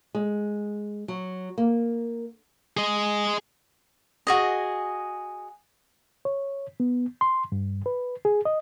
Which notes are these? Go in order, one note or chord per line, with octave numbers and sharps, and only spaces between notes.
G#3
F#3
A#3
G#4 D#5
F#4 G#4 D#5
C#5
B3
C6
G2
B4
G#4
D#5